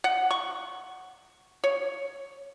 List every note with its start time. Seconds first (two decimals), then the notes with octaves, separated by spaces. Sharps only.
0.04 F#5
0.31 C#6
1.64 C#5